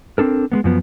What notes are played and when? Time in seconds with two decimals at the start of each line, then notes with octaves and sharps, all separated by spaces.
0.18 C4 D4 A4 A#4
0.52 G#3 A#3 B3
0.64 F#2 F3 B3